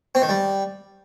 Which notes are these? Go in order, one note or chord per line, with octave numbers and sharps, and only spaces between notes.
C4
D#3
G3